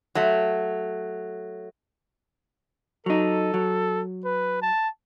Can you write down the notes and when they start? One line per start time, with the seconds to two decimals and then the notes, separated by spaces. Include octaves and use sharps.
0.15 F#3 A3
3.06 F#3 D#4 A4
3.54 F#3
4.25 B4
4.62 A5